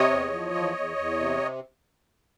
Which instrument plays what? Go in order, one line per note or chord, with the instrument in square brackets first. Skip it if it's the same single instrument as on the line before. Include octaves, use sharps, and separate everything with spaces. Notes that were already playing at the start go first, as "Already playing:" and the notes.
Already playing: [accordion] C3 C#5 D#5
E2
F3
E2
E2
E2
C3